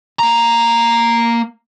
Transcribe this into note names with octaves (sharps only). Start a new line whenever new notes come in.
A#3 A#5